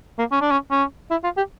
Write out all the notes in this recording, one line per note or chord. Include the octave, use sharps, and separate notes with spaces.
A#3
C#4
D4
C#4
C#4
E4
F4
G4